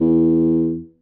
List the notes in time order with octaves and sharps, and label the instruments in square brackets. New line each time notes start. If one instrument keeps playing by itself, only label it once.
[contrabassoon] E2